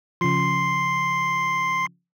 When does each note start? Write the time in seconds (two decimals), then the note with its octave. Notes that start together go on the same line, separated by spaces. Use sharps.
0.21 C#3 F3 C6 C7